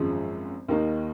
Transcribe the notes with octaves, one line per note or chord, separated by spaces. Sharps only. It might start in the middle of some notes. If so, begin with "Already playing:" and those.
Already playing: G#1 F#2 F3 G#3
D#2 D#3 A#3 D#4